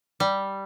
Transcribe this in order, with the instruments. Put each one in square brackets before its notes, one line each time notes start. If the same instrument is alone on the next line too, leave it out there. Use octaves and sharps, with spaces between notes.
[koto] G3